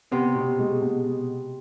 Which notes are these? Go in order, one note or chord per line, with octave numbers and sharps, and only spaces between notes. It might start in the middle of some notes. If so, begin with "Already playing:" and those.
C3 B3
B2
G#3
B2